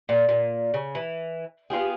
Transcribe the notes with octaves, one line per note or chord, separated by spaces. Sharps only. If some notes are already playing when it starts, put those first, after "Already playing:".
A#2
A#2
C#3
E3
B3 F4 G4 G#4